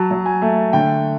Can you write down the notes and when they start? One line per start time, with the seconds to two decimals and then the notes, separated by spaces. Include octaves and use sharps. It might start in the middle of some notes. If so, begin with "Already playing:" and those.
Already playing: F#3 A5
0.11 F#3
0.26 G#5
0.42 A3
0.73 D3 G5